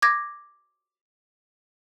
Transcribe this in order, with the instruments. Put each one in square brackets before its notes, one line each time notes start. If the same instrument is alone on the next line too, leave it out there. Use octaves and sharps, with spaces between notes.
[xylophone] D6 G#6 A#6